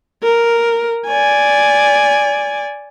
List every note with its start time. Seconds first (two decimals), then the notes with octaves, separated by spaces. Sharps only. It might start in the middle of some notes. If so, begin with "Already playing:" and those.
0.23 A#4
1.08 D5 G#5